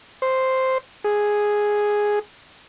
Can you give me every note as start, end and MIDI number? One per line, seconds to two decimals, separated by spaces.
0.22 0.78 72
1.04 2.19 68